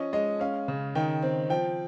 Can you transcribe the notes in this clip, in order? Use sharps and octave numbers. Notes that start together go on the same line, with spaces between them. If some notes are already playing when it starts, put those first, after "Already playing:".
Already playing: F3 C#4 D#5
G#3 D#5
C#4 F5
C#3
D#3 G5
C4
F3 G5